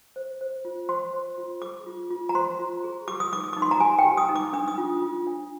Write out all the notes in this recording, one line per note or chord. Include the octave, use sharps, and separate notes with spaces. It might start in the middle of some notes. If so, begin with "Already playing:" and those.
C5
C5
F4
C5 C6
C5
F4
G#4 D6
F4
F4
A#5
C5 C6
F4
G#4
G4 D6
D#6
D#4 D6
D#6
D#4 D6
C6
A#5
G4 G#5
G5
G4
D#6
D#4
D6
D4 D#6
D#6
F4
F4
D4